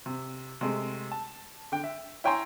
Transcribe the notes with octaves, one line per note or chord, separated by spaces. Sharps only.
C3
C3 G#3 A3
A5
D3 G5
E5
E4 C#5 G5 G#5 A#5 C6